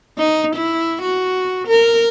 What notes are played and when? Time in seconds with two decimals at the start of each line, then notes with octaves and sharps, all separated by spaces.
0.18 D#4
0.55 E4
1.02 F#4
1.68 A#4